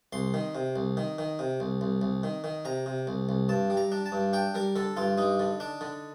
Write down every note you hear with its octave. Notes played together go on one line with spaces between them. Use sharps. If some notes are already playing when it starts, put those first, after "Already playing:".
C2 C6
D#3
C3
C2
D#3
D#3
C3
C2
C2
C2
D#3
D#3
C3 A#5
C3
C2
C2
G2 A5
G3
A#5
D4
A5
G2
D4 G5
G3 A#4
D3 A4
G2 F4
G2 D#4
D3
D4
D3